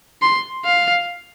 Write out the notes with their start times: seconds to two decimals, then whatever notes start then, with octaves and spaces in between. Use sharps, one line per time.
0.22 C6
0.65 F5